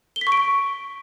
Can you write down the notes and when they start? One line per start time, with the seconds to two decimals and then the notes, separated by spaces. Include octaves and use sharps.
0.16 G7
0.21 B6
0.27 C#6
0.32 D7
0.37 C#6